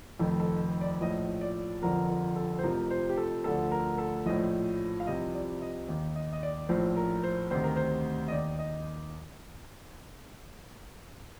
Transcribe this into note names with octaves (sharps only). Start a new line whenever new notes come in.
F1 F2 D#3 A4
A4
D5
A#1 A2 F3 D#5
D5
G1 F2 D3 F3 A#4
A#4
A4
C5
F1 F2 C3 F3 A#4
C5
G4
A4
D2 D3 F3 A4
A#4
A4
A#1 A2 F3 D#5
F5
C2 C3 F3 D#5
D5
D#5
D#2 D#3
D#5
D#5
D5
A#1 A2 F3 C5
A#4
C5
D2 C3 D#3 C5
A#4
C5
D#5
D#2 D#3 D5
D#5